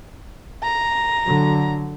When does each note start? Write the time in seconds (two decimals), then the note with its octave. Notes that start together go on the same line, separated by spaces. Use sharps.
0.63 A#5
1.24 D3 F#3